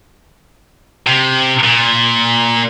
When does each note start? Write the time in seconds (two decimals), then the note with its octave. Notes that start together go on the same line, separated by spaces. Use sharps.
1.07 C3
1.64 A#2